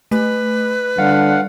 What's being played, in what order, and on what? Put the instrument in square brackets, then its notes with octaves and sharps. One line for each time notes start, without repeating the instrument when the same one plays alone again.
[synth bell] A3 [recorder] B4
[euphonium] D3 [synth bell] G3 [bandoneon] F5 F#5